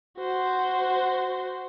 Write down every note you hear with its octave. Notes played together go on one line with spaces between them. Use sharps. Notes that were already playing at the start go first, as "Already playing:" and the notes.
F#4 C5